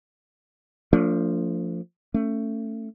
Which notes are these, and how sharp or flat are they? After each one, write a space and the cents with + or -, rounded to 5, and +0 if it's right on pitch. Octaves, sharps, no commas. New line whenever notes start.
F3 +0 A3 +40 D4 -25
A3 +20 C#4 +0